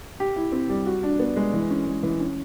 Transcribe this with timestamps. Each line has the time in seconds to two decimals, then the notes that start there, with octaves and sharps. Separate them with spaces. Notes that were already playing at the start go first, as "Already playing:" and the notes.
0.20 G4
0.36 E4
0.52 C4
0.69 G3
0.86 F#4
1.03 D4
1.19 B3
1.36 G#3
1.53 E3
1.70 C#4
1.87 G#3
2.03 E3
2.20 C#4